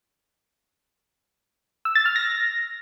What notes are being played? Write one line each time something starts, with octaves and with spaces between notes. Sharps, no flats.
E6
A6
F6
A#6